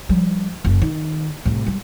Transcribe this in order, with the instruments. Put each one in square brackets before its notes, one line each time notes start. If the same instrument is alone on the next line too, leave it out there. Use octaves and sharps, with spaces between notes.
[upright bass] F3 G3
F#1
D#3
C2 A2
G3